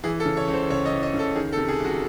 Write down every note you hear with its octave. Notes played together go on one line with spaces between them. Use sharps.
E3 G#4
A4
C#3
C#5
C#2
C5
C#2 C#5
D#5
E3
D#5
C#3
A4
D#3 G#4
A4
C3
G#4
C2
F#4